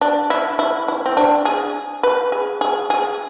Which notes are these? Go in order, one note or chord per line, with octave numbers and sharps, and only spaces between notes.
D4
E4
E4
E4
C4
D4
G#4
B4
G#4
G#4
G#4